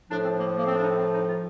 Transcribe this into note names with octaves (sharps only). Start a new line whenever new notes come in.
A2 F3 D4
C4
A#3
A#3
C4
D4
D#4
C4
D#4
F4